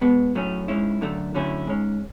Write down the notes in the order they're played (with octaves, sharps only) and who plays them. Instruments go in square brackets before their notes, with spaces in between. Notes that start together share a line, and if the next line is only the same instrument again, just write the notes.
[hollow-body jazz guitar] B2 G#3 B3
A2 F#3 A3 C#4
G#2 G#3 C#4 E4
F#2 D3 A3
D3 F#3 A3 C#4 E4
G#2 G#3 C#4